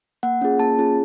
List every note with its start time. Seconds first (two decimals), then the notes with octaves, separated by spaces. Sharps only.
0.23 A#3 F#5
0.41 C#4 F4 G#4
0.59 A#3 A5
0.79 C#4 F4 G#4